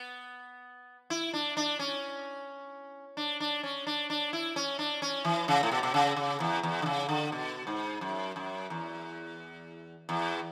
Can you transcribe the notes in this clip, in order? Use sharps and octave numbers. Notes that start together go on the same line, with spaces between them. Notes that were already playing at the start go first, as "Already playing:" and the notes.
Already playing: B3
E4
D4
D4
C#4
D4
D4
C#4
D4
D4
E4
C#4
D4
C#4
E3
C#3
A2
B2
B2
C#3
C#3
E2
E2
D3
C#3
D3
B2
G#2
F#2
F#2
E2
E2